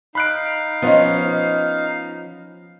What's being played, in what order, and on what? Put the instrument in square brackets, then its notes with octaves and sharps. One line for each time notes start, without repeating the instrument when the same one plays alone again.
[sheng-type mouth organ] D#4 F5 [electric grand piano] B5 F#6 D7
[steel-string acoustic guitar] F3 D#5 [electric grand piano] B3 C#4